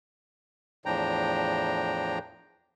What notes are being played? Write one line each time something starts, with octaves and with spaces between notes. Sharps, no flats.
E2 A2 F3 D4 G5 A#5